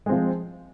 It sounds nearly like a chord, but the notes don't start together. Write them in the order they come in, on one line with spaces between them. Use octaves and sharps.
G#3 C4 F3